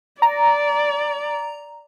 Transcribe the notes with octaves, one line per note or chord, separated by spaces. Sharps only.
D5 A#5